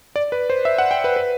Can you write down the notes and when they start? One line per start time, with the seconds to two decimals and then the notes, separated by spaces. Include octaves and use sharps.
0.16 D5
0.32 B4
0.50 C5
0.65 E5
0.78 F#5
0.91 G5
1.04 B4
1.16 B4